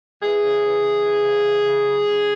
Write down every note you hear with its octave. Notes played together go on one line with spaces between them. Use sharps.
E3 G#4
C#3
E3
C#3
E3
C#3
E3
C#3
F#3
C#3